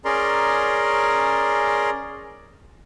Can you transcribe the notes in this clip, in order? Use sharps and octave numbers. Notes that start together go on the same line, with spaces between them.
C#4 G#4 A#4 D5 A#5 C6